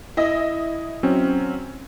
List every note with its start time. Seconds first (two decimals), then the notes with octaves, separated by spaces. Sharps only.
0.17 E4 D#5
1.03 F#3 C4 C#4